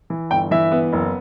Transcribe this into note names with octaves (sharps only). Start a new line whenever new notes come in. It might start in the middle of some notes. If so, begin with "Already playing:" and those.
E3
G1 G5
E3 E5
B3
F#1